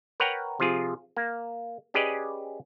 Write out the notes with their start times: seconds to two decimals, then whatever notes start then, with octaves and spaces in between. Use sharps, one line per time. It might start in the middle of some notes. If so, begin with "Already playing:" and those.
0.20 A#4 B4 C#5 F#5 G5 A#5
0.60 C3 F3 F4 G#4
1.17 A#3
1.94 C#4 G4 G#4 B4 D5 D#5